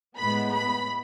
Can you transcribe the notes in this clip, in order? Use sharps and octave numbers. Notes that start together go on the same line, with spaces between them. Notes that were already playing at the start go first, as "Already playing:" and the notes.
A2 G#3 B3 B5
B5